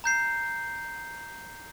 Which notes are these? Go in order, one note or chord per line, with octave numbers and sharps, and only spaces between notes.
A#5 G6 C7